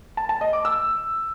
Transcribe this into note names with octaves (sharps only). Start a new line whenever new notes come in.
A5
A5
D#5
D6
E6